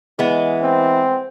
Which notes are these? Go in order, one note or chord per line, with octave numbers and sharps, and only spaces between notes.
E3 G#3 B3
C4